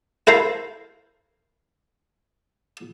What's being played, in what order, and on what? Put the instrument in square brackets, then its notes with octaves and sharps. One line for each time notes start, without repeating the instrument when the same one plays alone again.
[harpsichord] E4 A4 A#4 C5 F5 A#5